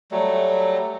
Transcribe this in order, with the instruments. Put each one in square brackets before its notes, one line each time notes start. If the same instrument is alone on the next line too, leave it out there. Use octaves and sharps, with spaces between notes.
[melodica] F#3 G3 A3